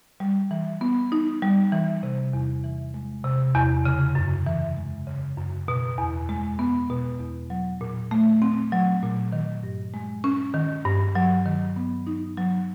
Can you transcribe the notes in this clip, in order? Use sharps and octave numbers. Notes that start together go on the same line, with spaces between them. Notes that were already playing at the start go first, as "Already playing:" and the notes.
G3
E3
B3
D#4
G3
E3
C3
E2
E3
G#3
C3
E2
C#3
F#2
E3
G#3
C#3
F#2
B2
E2
G#3
B3
B2
E2
F#3
A#2
A3
C4
F#3
A#2
D#3
G2
G#3
C#4
D#3
G2
F#3
D#3
B3
D#4
F#3